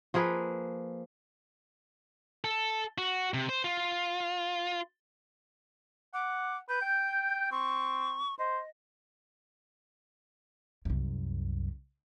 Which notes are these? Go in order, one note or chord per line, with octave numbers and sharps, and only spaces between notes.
F3 A#3 G#4 B4
A4
F#4
C3
C5
F4
F#5 D6
B4 G6
G5
C4 C#6
C5 D#5
C2 F#2